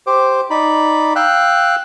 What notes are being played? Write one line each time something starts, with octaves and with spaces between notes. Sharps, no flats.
G4 C5 D6
D#4 D5 B5
F5 G5 E6 F#6